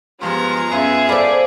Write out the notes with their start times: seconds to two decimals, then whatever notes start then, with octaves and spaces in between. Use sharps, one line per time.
0.21 G2 F3 G#3 B3 F4 A#5
0.71 F#2 B3 F4 G#4 E5
1.09 A4 C5 D5 F5 B5